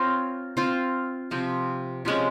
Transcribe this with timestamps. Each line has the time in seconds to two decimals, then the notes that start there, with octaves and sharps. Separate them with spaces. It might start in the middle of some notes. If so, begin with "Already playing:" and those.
Already playing: C4 F4 A#4 C#5
0.57 C4 F4 C5
1.31 C3 F3 C4
2.05 C3 F3 G#3 C#4